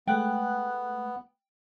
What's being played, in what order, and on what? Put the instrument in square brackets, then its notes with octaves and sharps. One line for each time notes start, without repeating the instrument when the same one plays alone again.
[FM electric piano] G#3 A3 F#6 [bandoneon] B3 [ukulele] G5